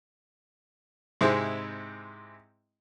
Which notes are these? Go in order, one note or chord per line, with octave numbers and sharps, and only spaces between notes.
G#2 C3 G#3 C4 E4 G#4